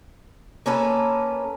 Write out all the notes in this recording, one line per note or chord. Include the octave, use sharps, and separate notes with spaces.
A#3 C#4 A4 B4